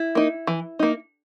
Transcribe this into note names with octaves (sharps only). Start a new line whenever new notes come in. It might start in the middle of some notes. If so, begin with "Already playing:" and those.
Already playing: E4
A#3 D#4
E3
A#3 D#4